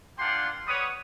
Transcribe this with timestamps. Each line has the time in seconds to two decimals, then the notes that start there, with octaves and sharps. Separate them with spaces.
0.19 A#3 D4 F4 F#5 G5 C6
0.67 G3 B4 C#5 F#5 D#6